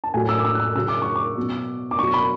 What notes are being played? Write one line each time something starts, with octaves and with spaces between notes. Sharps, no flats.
A5
A2 F#3 G#5
E6
D6
E6
F#6
E6
C#3 F#3 E6
D6
C#6
D6
B2 F#3
D6
B2 F#3 C#6
B5